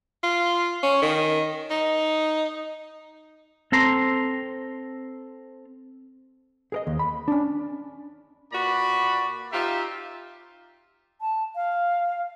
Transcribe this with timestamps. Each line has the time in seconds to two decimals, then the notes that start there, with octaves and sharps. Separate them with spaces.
0.23 F4
0.83 C#4
1.02 D#3
1.70 D#4
3.72 C4 A4 A#5 C6
6.72 G#4 A#4 D#5
6.87 D#2
6.99 B5
7.28 C#4 D4
8.52 A#2 F#4 B4 D5 B5
9.52 D#4 F4 G4 E5
11.21 A5
11.56 F5